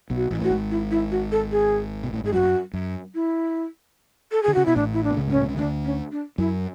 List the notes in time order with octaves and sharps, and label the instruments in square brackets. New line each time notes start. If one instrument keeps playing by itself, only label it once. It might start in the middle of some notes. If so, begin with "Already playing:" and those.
[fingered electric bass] B1 B2
[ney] F#4
[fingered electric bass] A1 A2
[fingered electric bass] A2 [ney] F#4
[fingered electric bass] G#1 G#2
[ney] E4
E4
F#4
A4
G#4
[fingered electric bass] B2
A2
[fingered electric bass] G#2 [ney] G#4
[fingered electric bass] F#2 [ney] F#4
[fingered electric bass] F#2
[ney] E4
A4
G#4
[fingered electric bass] D3
[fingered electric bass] C#3 [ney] F#4
[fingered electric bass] B2 [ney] E4
[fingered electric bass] A1 A2 [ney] D4
[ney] E4
D4
[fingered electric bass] B2
C#2 C#3
G#2
[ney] C#4
[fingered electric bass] A2
B2
C#3
[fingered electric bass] D2 D3 [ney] D4
[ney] C#4
D4
[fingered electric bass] F#2 F#3 [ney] E4